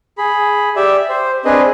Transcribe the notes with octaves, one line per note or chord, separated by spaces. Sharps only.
G#4 B5
G4 D5 E5
C5
C4 D4 G#4 B4 D#5